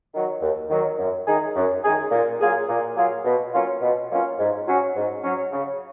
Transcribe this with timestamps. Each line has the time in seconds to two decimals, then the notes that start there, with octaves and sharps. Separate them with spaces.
0.14 D#3 F#3
0.41 D#2
0.70 D#3 F#3
0.98 F#2
1.26 D#3 G#3 D#4 G#4
1.56 F#2
1.84 D#3 G#3 D#4 G#4
2.11 A#2
2.41 F#3 A#3 F4 G#4
2.68 A#2
2.97 F#3 A#3 F4 G#4
3.25 B2
3.54 F#3 A#3 C#4 F4
3.82 B2
4.10 F#3 A#3 C#4 F4
4.39 G#2
4.67 F#3 C#4
4.96 G#2
5.23 F#3 C#4
5.52 C#3